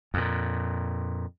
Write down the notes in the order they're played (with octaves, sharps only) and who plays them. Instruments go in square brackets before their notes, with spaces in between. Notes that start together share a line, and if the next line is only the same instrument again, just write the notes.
[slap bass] F2 A#2